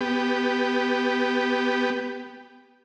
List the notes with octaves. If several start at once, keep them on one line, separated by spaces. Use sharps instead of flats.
B3 G4